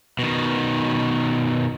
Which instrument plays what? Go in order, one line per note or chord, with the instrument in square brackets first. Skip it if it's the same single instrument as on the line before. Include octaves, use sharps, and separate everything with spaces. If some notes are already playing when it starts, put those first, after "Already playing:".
[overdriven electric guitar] B2 D#3